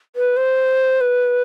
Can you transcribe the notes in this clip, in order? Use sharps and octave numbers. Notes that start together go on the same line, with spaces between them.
B4
C5
B4